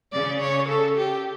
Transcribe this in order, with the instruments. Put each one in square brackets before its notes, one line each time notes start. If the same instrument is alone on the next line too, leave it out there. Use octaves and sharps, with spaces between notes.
[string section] C#3 [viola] D5
[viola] C#5
A4
G4